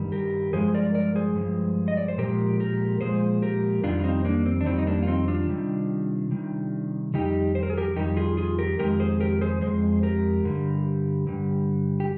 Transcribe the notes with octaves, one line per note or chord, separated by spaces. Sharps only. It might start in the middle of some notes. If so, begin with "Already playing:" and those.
Already playing: G2 D#3 G3
G4 A#4
G2 F3 G#3 G#4 C5
A#4 D5
A#4 D5
G#4 C5
G2 F3 G#3
D#5
D5
C5
A#2 F3 G#3 G4 A#4
G4 A#4
A#2 F3 G#3 G#4 C5
G4 A#4
F2 D#3 G3 D4 F4
F4
C4 D#4
A#3 D4
C4
D4
F2 D#3 G3 C4
D#4
A#3 D4
F4
C4 D#4
D4 F4
C3 D#3 G3
C3 D#3 G3
F2 D#3 G3 D#4 G4
C5
A#4
G#4
G4 A#4
F2 D#3 G3 D#4 G4
F4 G#4
F4 G#4
G4 A#4
F2 D#3 G#3 G4 A#4
G#4 C5
G4 A#4
G#4 C5
F2 D#3 G#3 G#4 C5
G4 A#4
G2 D3 G3
G2 D3 G3
G4